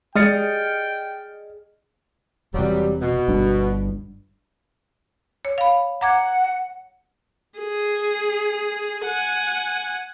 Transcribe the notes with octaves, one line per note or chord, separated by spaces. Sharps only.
G#3 G#4 D#5 G5 F6 A6 C#7
E1 C3 E3 F#3 G3
B2
G1 G3 D4
C#5
F5 B5
F#5 A#5 D6 G#6
G#4
F#5 G#5